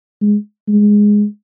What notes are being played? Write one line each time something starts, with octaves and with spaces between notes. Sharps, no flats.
G#3
G#3